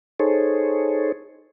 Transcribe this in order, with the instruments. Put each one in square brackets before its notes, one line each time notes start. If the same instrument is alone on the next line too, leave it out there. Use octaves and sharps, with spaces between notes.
[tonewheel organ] D#4 G#4 A4 C5 C#5